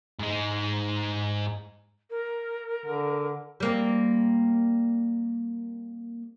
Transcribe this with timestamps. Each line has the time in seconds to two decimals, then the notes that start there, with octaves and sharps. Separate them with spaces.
0.19 G#2 G#3
2.10 A#4
2.86 D3
3.60 G3 A#3 C4